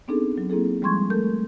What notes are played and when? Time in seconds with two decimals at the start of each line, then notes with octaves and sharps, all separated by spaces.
0.08 B3 C4 D4 D#4 G#4 A4
0.38 F#3
0.50 A#3 C4 E4 G#4 A4
0.82 F3 G3 G#3 C6 C#6 G#6
1.10 A3 A4 A#4 G6